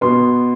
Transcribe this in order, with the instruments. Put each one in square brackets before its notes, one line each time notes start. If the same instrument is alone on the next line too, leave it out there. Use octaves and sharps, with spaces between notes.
[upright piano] B2 B3 C6